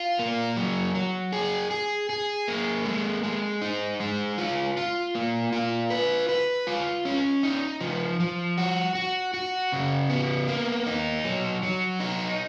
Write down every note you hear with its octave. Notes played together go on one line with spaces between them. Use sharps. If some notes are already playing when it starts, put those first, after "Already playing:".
Already playing: F4
A#3
F#3
F#3
G#4
G#4
G#4
A#3
G#3
G#3
D#4
G#3
F4
F4
A#3
F4
B4
B4
F4
C#4
D#4
F3
F3
F#4
F#4
F#4
C#3
B3
A#3
D#4
F#3
F#3
D#4